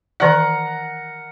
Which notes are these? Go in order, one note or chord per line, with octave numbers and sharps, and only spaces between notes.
D#3 E3 A#4 D5 F#5